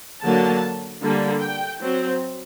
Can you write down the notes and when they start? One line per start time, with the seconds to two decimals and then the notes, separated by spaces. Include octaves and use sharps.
0.24 D3 F#3 A#3 A5
1.02 D3 G3 A#3
1.40 G5
1.80 F#3 C4